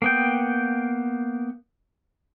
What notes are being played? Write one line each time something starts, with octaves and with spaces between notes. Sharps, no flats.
A#3 B3 G5